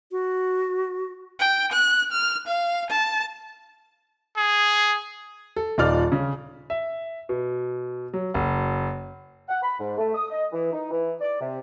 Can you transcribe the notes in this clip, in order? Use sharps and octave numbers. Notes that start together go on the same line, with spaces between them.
F#4
G5
F#6
F6
F5
A5
G#4
A4
D#1 D#4 F4 D5 F6
C#3
E5
B2
F#3
F#1
F#5
B5
G#2
A3
D#6
D#5
E3
D#4
E3
D5
C3